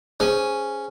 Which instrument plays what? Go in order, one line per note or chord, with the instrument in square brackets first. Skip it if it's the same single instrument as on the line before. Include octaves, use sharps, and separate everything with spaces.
[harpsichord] C#4 [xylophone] G#4 C5 G#5